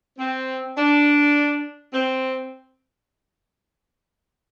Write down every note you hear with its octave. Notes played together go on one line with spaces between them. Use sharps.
C4
D4
C4